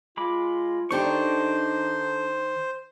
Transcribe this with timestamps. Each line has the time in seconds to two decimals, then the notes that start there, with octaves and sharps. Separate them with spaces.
0.17 G#3 F4 B5 D6
0.91 D#3 A3 D4 D#4 G4 C5 C#6